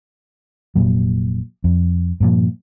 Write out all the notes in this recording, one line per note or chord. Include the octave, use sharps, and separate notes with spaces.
F1 C#2 A#2 F#3
F2
G2 A#2 F3